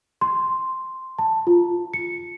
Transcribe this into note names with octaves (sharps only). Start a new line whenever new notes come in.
C6
A5
F4
C#7